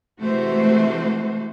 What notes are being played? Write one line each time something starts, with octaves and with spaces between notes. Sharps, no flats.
C3 E3 G#3 A3 F#4 C5